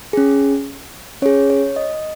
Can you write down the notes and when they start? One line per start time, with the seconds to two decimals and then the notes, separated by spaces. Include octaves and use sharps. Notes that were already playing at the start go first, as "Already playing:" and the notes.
0.13 C#4 G#4
1.22 C#4 C#5
1.26 G#4
1.50 C#5
1.76 D#5